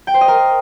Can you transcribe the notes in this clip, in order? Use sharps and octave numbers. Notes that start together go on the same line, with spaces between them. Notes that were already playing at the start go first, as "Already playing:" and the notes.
G5
C5
D#5
A#4